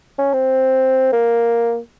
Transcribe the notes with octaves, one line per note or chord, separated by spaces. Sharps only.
C#4
C4
A#3